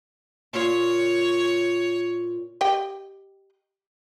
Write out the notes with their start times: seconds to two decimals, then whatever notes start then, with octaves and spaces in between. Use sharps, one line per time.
0.53 A#2 F4 C#5
2.61 G4 D#5 G5